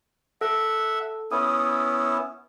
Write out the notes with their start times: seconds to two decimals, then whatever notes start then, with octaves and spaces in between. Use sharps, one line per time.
0.41 A4 E5 F#5
1.32 B3 C#4 E4 D#6